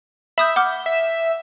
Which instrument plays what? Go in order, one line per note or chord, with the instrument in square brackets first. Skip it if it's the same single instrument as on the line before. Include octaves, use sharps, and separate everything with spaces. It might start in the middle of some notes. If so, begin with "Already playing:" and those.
[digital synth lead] E5 [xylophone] B5 D#6 G6
[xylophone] F#5 D6 F6 [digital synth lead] G6
[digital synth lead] E5